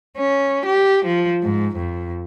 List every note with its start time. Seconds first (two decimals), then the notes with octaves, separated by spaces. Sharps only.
0.17 C#4
0.65 G4
1.04 F3
1.43 G#2
1.76 F2